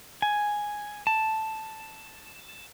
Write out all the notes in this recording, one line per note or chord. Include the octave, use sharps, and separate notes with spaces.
G#5
A5